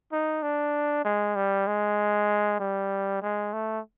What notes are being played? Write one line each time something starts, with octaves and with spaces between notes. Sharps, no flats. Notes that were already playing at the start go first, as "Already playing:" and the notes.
D#4
D4
G#3
G3
G#3
G3
G#3
A3